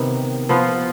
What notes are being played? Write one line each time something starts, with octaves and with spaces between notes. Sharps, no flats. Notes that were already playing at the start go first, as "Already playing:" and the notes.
Already playing: C3 D#3 B3
F3 B3 F4